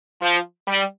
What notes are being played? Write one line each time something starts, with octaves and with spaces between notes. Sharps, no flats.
F3
G3